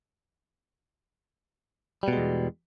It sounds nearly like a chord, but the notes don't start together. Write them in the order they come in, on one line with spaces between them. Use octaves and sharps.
G3 B2 G#3 E2